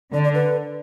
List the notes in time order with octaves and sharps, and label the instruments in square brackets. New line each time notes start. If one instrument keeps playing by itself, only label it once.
[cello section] D3 [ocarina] D5
[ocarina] D5
B4